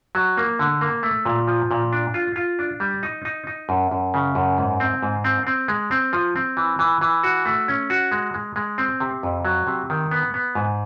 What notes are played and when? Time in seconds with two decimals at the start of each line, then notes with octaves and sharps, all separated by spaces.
0.15 F#3
0.37 A#3
0.59 D3
0.81 A#3
1.03 A3
1.26 A#2
1.48 F3
1.71 A#2
1.93 D4
2.14 F4
2.36 F4
2.59 D4
2.80 G3
3.03 D#4
3.25 D#4
3.47 D#4
3.69 F#2
3.91 F#2
4.14 C#3
4.35 F#2
4.58 G#2
4.80 C4
5.03 G#2
5.24 C4
5.47 C4
5.68 G#3
5.91 C4
6.13 F3
6.36 C4
6.57 E3
6.79 E3
7.01 E3
7.23 F#4
7.45 A3
7.68 C#4
7.90 F#4
8.12 G#3
8.34 G#3
8.56 G#3
8.78 C4
9.00 C3
9.23 F2
9.45 F#3
9.67 C3
9.90 D#3
10.11 B3
10.34 B3
10.55 G#2